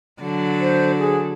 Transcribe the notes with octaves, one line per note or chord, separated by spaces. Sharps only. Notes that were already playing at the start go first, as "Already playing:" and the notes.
D3 F#3 A4
C5
G#4